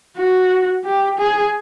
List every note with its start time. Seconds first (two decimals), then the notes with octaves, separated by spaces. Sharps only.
0.17 F#4
0.84 G4
1.18 G#4